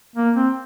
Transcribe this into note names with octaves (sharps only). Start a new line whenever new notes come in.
A#3
C4